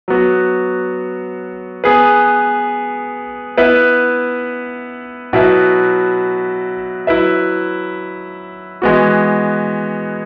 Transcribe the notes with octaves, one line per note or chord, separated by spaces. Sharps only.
F#3 B3 F#4
B3 G#4 B4
B3 E4 B4 E5
B2 F#3 E4 B4 E5
F#3 E4 B4 E5
E3 G#3 B3 F#4